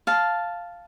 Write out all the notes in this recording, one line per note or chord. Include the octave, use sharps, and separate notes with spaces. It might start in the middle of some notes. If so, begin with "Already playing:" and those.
F5 A5